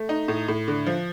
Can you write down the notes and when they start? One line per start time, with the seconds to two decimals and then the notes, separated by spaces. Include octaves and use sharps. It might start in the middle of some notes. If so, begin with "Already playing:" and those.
Already playing: A3
0.09 D#4
0.28 A2
0.48 A2
0.68 D3
0.86 F3